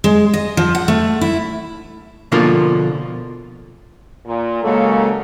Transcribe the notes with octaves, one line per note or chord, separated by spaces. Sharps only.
G#3
D#5
F3
F#5
A3
E4
B2 D3 F3 A#3 D4 F4
A#2
C#3 F#3 G#3 A#3 A4